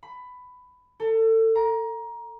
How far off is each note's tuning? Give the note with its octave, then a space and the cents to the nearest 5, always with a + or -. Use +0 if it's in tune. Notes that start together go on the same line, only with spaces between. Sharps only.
B5 +15
A4 +30
A#5 +20